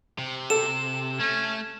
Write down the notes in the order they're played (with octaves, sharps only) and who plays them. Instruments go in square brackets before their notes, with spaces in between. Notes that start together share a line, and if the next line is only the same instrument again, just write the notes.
[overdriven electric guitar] C3
[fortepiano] A4 [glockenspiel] E7
[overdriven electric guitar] A3 [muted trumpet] C#4